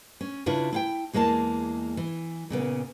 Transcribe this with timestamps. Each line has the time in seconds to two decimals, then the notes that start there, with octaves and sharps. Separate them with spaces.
0.21 C#4
0.46 C#3 D4 E4 F4 B4
0.73 E4 F5 G5
1.13 E2 G#3 A#3 E4 A5
1.97 E3
2.50 A#2 C#3 B3